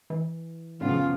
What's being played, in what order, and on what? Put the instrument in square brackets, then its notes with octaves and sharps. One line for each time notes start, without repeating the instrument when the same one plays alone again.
[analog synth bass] E3
[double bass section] F#2 C#3 F3 [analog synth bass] A2 [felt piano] B3 C#4 [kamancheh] F4